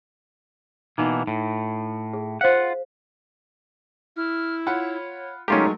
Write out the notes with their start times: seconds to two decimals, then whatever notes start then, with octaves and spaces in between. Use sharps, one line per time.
0.98 B2 E3 A#3 D#4
1.27 A2
2.13 G#4
2.41 F4 C5 F5 F#5
4.16 E4 F6
4.66 F4 C#5 F#5 B5
5.48 F#3 G#3 A3 C#4 D#4 F4 G4 A#4